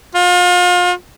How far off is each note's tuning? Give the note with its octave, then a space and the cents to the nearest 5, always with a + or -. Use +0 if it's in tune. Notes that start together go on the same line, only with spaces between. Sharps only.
F4 +35